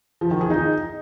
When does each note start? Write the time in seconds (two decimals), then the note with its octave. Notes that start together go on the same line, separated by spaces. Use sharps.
0.21 F3
0.31 D#3
0.41 G#4
0.50 D#4